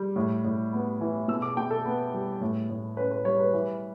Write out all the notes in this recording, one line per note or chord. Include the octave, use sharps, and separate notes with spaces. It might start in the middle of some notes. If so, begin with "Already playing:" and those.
Already playing: G3
A2
A2
B3
E3
B2 E6
D6
B2 G5
A4
B3
G3
A2
A2
C#4 B4
B4
G3 C#5
B4
E3